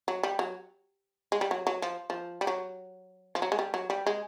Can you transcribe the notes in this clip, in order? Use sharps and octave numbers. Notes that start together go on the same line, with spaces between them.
F#3
G3
F#3
G#3
G3
F#3
F#3
F3
F3
G3
F#3
F3
F#3
G#3
G3
F#3
G3
G#3